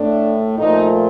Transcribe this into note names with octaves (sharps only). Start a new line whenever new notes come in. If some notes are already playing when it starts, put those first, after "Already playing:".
Already playing: A2 A3 D4
A#2 F3 A3 D#4